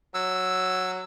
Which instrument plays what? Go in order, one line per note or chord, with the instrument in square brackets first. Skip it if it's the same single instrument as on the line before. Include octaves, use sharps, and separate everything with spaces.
[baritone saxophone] F#3 [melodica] E6